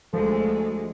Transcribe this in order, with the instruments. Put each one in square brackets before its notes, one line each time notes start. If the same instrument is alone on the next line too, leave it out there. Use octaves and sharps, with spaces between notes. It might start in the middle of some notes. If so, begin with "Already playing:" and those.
[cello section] D2 G#3 [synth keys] F3 [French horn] A4